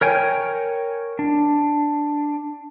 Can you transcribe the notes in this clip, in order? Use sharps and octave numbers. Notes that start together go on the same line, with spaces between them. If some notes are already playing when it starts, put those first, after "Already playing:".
A#4 C#5 G5 G#5
D4